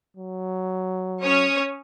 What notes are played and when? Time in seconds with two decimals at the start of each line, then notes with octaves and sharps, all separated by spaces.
0.17 F#3
1.22 C#4 C#5 D#6